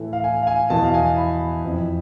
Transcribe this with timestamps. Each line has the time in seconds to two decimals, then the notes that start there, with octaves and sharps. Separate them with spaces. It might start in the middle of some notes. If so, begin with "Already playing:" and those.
Already playing: A2 E3 A4
0.13 F5
0.24 G#5
0.43 F5
0.47 G#5
0.70 E2 B2 A5
0.84 F5
0.94 G#5
1.17 B5
1.64 F2 E3